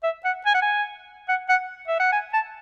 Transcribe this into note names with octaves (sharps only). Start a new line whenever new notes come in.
E5
F#5
G#5
F#5
G#5
F#5
F#5
E5
F#5
G#5
A5